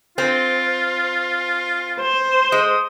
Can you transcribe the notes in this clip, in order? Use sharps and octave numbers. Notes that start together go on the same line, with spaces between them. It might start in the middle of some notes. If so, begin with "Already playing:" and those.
C4 F4
C5
G#3 D#6